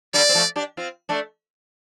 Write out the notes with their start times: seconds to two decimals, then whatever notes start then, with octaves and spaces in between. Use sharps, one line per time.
0.14 D3 G3 D5
0.29 C4
0.34 F3 A3
0.56 D4 G4
0.77 C4 F4
1.09 A3 D4